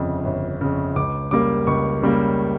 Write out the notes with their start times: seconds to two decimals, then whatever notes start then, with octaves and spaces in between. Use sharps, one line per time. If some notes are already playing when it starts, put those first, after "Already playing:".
Already playing: G1 F2 C#3
0.25 G1
0.61 F2 C#3
0.96 C#2 D6
1.31 C#3 G3 A#3 D6
1.67 C#2 C#6
2.02 C#3 G3 A#3